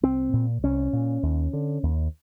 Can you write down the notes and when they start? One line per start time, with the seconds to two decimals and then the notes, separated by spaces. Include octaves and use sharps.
0.03 C2 C4
0.33 A#2
0.63 C2 C#4
0.93 A#2
1.23 D#2
1.53 D3
1.83 D#2